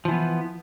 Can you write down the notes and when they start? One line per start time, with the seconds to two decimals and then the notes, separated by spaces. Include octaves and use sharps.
0.05 F3
0.08 E3
0.11 B3